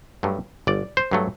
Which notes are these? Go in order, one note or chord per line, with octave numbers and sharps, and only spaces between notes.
G2 F#3 A3
G1 D5
C5
G2 F#3 A3